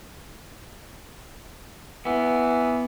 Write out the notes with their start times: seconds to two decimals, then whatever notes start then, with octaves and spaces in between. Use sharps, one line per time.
2.05 E3 B3